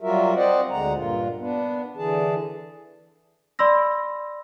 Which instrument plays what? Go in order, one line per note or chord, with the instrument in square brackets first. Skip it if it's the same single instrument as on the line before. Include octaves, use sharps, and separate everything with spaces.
[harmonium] F#3 G3 F4 F#4 A#4 E5
C4 C5 D5 D#5 F#5
D2 D3 G#3 F#5 A#5
G2 A#2 F4
B3 D4
D3 E3 G#4 A5
[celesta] D5 B5 C6 E6 A#6